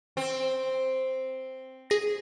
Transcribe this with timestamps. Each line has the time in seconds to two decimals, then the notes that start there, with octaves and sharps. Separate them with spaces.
0.17 C4
1.90 G#4 A#6